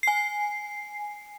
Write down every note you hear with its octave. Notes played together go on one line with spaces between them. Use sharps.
G#5 C7